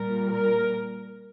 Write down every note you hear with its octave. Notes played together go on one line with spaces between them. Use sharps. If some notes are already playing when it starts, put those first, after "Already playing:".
Already playing: A#2 G3 A#4
A#4